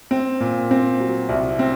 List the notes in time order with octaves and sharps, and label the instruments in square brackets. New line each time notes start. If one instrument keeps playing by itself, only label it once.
[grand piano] C4
A#2
C4
F#3
C2
C4